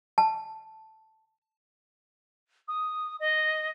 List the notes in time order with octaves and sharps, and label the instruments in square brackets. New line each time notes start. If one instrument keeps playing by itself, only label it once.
[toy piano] A5
[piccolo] D#6
D#5